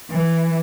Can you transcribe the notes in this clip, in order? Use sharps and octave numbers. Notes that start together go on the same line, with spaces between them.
E3